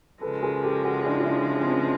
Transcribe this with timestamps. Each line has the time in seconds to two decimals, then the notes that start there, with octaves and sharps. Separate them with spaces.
0.21 C#3 F3 G#3 A4 B4
0.42 G#4 A#4
0.63 G4 A4
0.84 F#4 G#4
1.04 D4 E4
1.19 F4
1.25 D4 E4
1.61 C4
1.68 B3 C#4